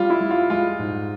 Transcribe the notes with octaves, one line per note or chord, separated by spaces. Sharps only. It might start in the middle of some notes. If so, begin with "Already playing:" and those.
Already playing: G3 F4
E4
G3
F4
G#3 F4
G#2